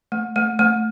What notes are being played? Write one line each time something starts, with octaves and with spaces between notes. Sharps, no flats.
A3
A3
A3